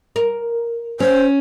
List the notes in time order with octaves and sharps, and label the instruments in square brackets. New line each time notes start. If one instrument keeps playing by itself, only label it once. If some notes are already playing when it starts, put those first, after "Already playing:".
[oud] A#4
[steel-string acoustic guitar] C#4 [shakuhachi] C5